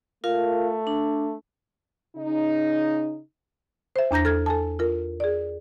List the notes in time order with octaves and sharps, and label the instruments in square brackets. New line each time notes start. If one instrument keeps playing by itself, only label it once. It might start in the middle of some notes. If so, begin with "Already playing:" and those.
[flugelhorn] A3 [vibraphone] F4 A#4 F5
[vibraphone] D4
[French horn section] C#3 D#4
[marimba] C5 E5
E2 D4 A#5 G6 A#6
A4 F6 G#6
A4 G#5 A5
F4 A#4
G#4 D5